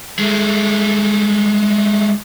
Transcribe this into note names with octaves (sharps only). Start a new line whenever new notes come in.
G#3 A3